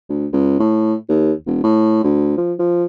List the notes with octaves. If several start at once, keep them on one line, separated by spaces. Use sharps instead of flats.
D2
C#2
A2
D#2
E1
A2
D2
F3
F3